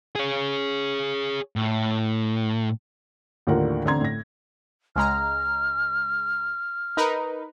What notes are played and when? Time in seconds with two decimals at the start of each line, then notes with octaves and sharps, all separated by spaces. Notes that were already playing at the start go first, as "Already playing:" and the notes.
0.15 G#4 C#5
1.56 A2
3.47 D#2 A2 D3 F4 A#4 F#5
3.85 A1 D3 C4 A#5 C6 G#6
4.01 A2 A#6
4.96 C#2 G#3 A#5 F6
6.97 D#4 A#4 B4